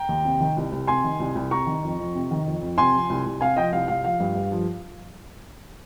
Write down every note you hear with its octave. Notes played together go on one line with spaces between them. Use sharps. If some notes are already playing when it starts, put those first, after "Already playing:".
Already playing: G5 A#5
D#2
C3
D#3
C2
C2
C3 G#5 C6
D#3
C2
C2
C3 A#5 C#6
D#3
F2
F2
C3
D#3
F2
F2
C3 G#5 C6
F3
C2
C2
C3 F5 G#5
F3 D#5 G5
C2 F5
C2 F5
F3 F5
G2
G2
F3